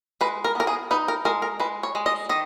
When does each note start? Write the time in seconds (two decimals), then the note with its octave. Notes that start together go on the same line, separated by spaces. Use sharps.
0.21 G#3 B4
0.44 A#4
0.55 B3 A#4
0.67 G#4
0.91 D#4 B4
1.08 A#4
1.25 G#3 A#4
1.42 A#4
1.60 G#3 B4
1.83 C#5
1.95 G#3
2.06 D#5
2.29 D#3 D#5